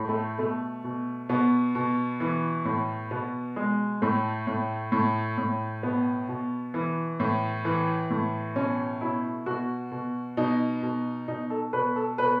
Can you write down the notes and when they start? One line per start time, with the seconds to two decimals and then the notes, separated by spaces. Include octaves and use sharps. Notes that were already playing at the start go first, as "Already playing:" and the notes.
Already playing: A2
0.09 A3
0.39 B2 A3
0.84 B2
1.29 B2 B3
1.75 B2
2.20 E3
2.65 A2
3.11 B2 B3
3.56 B2 G#3
4.02 A2 A3
4.47 A2
4.92 A2
5.38 A2
5.83 B2 B3
6.29 B2
6.74 E3
7.20 A2
7.65 E3
8.10 A2
8.56 B2 C#4
9.01 B2 E4
9.46 B2 F#4
9.92 B2
10.37 B2 D#4
10.83 B2
11.28 B2 D#4
11.50 A4
11.73 B2 B4
11.96 A4
12.18 B2 B4